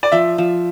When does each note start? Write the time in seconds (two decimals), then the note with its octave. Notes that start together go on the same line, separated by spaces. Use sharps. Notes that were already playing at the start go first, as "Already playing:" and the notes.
0.03 D5
0.12 F3 E5
0.38 F3